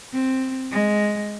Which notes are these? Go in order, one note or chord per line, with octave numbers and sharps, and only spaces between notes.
C4
G#3